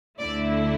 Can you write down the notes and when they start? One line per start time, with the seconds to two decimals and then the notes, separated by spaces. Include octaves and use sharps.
0.19 D2 D3 A3 E4 D5